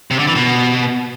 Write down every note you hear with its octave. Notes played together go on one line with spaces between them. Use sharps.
C3
D3
E3
B2